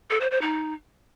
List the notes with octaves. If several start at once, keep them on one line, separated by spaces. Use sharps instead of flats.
A4
C5
C5
D#4